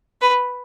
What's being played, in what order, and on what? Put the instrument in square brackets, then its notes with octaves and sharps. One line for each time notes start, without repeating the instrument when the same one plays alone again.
[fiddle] B4